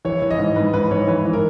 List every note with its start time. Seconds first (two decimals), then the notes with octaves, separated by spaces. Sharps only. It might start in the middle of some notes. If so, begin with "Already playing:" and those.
0.05 E3 C#5
0.22 E3
0.31 D#5
0.39 G#2
0.56 G#2 B4
0.74 G#2 B4
0.91 G#2 C#5
1.07 E3 B4
1.25 E3
1.33 A#4